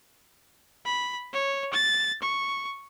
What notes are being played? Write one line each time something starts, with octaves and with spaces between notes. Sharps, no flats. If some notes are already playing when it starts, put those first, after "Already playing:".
B5
C#5
A6
C#6